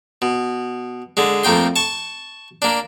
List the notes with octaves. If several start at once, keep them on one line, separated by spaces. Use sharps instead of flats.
B2
D3 G#3
F2 A3 A#3 G5 C6
A5 C#6
A#3 D4